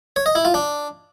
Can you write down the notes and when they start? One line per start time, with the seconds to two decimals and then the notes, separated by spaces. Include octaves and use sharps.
0.16 C#5
0.26 D#5
0.35 E4
0.45 F4
0.54 D4